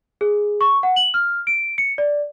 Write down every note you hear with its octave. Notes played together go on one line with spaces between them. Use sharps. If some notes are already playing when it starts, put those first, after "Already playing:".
G#4
C#6
F#5
F#7
F6
D7
C#7
D5